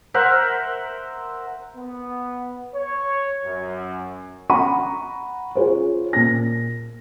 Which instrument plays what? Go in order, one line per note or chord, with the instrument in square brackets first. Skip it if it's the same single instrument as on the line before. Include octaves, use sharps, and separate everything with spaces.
[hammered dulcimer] A#4 C5 E5 F#5
[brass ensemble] B3
C#5
F#2
[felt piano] F#5 A#5 B5 C#6 D#7
F4 G#4 C5 C#5
A#2 A#6